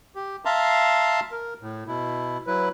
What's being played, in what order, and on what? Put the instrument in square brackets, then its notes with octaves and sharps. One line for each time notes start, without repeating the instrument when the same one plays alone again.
[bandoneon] G4
E5 F5 A5 A#5 C6
A#4
A2
B2 E4
F#3 E4 B4